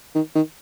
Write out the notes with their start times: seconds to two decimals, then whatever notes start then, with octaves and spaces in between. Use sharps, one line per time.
0.15 D#3
0.35 D#3